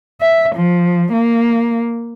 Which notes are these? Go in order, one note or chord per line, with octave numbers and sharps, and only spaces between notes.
E5
F3
A#3